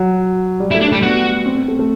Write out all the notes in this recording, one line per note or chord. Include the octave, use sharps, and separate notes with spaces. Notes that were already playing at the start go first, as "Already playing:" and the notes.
Already playing: F#3
G3
E4
A3
D4
G3 A3
B3 F#4
C4
C4
A3
A3